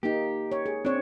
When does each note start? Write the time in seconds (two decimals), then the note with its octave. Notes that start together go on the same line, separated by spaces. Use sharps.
0.03 A#3 D#4 G4
0.52 C#5
0.66 G#4
0.85 C4 D4 C#5